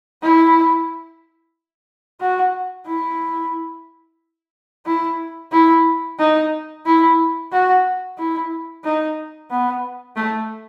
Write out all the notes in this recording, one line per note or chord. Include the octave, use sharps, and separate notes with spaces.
E4
F#4
E4
E4
E4
D#4
E4
F#4
E4
D#4
B3
A3